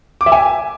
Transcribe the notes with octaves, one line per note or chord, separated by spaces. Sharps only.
D6
E5
G#5